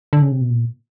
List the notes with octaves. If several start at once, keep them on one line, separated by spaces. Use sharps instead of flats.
D3
C#3
C3
B2
A#2